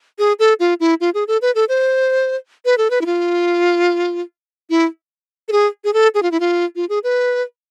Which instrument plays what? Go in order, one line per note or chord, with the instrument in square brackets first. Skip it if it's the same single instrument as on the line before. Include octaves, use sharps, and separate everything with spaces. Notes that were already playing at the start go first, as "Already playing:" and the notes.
[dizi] G#4
A4
F4
E4
F4
G#4
A4
B4
A4
C5
B4
A4
B4
E4
F4
E4
A4
G#4
G#4
A4
G#4
F4
E4
F4
F4
G#4
B4